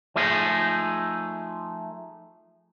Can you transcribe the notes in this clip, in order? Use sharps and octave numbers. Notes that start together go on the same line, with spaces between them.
F3 A3 D#4 G#4